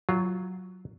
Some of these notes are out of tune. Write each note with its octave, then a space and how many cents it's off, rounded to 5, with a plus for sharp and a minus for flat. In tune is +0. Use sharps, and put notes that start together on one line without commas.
F#3 +0 F4 -10